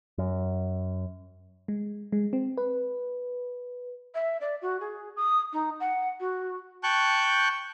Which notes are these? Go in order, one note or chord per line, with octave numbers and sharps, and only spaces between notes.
F#2
G#3
G#3
C4
B4
E5
D5
F#4
G#4
D#6
D#4
F#5
F#4
G5 A5 C#6 F#6 G6